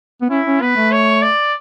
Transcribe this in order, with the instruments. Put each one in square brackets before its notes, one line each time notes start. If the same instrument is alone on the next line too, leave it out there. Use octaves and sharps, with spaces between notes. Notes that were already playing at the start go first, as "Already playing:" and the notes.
[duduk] B3
[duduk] C#4 [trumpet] E4
[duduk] C#4
[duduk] B3 [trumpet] B4
[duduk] A3
[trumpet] C#5
D5